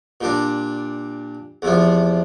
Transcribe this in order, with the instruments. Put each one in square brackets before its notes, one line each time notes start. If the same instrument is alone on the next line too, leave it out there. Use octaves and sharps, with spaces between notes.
[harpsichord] A#2 G3 D4
E2 C3 F3